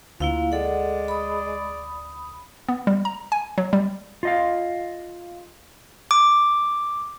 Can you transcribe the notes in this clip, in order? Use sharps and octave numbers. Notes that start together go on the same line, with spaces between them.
D2 A#3 E4 F4 F5
G#3 A4 D5 F#5
B5 D#6
B3
G3
A#5
G#5
F#3
G3
F4 D#5 F5
D6